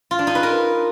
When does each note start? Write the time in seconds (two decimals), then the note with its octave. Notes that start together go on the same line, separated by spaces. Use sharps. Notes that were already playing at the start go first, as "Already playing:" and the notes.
0.11 F4
0.19 D4
0.27 D#4
0.35 B4
0.43 A#4